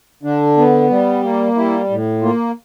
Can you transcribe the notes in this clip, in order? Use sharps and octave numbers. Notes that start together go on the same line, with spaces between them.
D3 D4
B3
G3
A#3
G3 E4
A2
A#3 F4